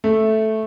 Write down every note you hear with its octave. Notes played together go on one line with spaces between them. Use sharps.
A3